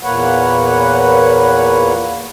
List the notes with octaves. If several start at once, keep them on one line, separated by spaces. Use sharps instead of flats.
E2 A#2 A#3 B4 C#5 F#5